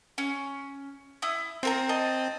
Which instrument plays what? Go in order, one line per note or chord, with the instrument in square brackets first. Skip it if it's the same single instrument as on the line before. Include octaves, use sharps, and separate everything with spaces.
[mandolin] C#4
E4 D#6
[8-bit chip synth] C4 [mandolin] F4 A#4 A#5
[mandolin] D#5 A5